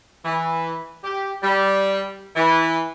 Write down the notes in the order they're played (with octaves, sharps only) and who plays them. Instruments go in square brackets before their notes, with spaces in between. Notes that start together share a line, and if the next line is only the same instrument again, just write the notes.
[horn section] E3
G4
G3
E3